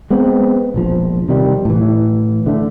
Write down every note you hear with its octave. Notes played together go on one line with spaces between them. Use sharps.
G#3 B3 C4
E1 A#1 F3
C3 D#3 G3
A2 E3
D3 A3